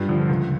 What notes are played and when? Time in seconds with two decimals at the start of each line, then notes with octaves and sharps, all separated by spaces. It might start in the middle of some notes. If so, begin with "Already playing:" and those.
Already playing: G2 F4
0.09 D3 F3
0.29 C#2